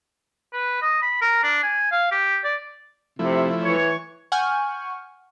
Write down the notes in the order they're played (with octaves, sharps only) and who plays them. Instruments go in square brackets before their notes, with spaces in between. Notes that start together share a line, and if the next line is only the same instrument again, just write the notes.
[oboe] B4
D#5
B5
A#4
D4
G#5
F5
G4
D5
[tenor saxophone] C3 [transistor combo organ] F3 A3 E4
[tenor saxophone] E3 [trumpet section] C#5
[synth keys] F#5 G#5 C#6 F6 G6